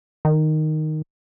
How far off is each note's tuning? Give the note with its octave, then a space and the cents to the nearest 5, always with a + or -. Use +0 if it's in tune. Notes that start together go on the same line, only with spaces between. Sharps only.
D#3 -5